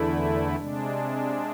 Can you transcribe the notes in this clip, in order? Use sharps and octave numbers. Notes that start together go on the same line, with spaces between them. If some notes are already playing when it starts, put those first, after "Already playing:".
Already playing: E2 D3 A3 E4
C3 G#3 D4